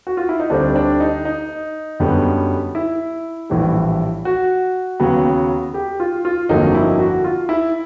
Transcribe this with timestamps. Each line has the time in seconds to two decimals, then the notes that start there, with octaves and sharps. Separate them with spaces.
0.07 F#4
0.17 F4
0.29 E4
0.40 D#4
0.50 D2 D3 G3 C4 D4
0.76 D4
1.00 D#4
1.25 D#4
2.00 F#2 D3 G3 B3
2.75 E4
3.50 A#1 A2 E3 G3
4.25 F#4
5.00 D#2 C#3 F#3 B3
5.74 G4
6.00 F4
6.25 F4
6.49 G1 F2 D3 F#3 A#3 D#4
6.75 E4
6.99 F#4
7.24 F4
7.49 E4